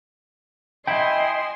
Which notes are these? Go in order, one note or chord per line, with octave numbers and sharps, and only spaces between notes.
E4 D#5 G5 G#5 C6